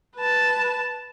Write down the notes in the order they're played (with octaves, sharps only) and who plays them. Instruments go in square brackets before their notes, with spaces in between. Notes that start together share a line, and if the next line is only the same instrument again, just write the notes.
[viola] B4 A5